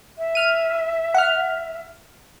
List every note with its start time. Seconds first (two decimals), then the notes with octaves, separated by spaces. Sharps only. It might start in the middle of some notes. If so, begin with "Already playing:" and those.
0.18 E5
0.35 F6 D#7
1.14 F#5 F6